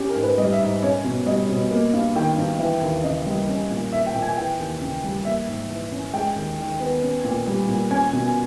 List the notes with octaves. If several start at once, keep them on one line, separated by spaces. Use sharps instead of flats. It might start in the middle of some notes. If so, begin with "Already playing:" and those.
Already playing: C#4 G4
A#4
G#2
B4
G3 D#5
E5
G#2
C#4 C#5
B2
G3 D#5
B2
A#3
G2
D#3 G5
G2
E3
D#2
C#3 D#5
G3
C#4
A#2
A#3 E5
G5
A#2
G#5
E3 G5
D#2
C#3
G3
A#3 E5
G#2
E3
C#4
G#3 G5
D#2
D#3
B3
C#4
A#2
G3
A#2
C#4 G#5
B2